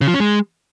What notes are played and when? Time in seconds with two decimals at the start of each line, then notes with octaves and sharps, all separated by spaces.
0.01 C#3
0.08 F3
0.14 C#4
0.20 G#3